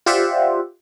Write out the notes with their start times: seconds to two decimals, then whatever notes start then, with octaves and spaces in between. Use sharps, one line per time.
0.06 F4 G4 C5 D5 E5 F#5